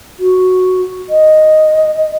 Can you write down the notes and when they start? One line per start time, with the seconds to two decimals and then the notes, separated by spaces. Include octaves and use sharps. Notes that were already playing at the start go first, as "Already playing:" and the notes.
0.19 F#4
1.10 D#5